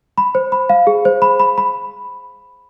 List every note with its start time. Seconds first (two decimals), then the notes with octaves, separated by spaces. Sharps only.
0.18 B5
0.35 C5
0.52 B5
0.70 F5
0.87 G#4
1.05 C5
1.22 B5
1.40 B5
1.58 B5